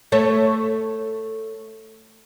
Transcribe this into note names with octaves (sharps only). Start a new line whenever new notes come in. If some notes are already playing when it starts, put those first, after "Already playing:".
A3 A4 C#5